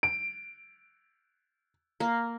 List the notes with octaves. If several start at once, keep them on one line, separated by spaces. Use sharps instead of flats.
D7
A#3